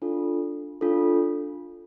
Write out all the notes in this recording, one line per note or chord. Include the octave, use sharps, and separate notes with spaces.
D4 F4 A4
D4 F4 A4